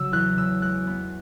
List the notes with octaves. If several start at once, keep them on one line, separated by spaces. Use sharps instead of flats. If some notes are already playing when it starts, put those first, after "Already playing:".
Already playing: C#3 F#3 E6
E2 F#6
C#3 E6
G#3 F#6
B3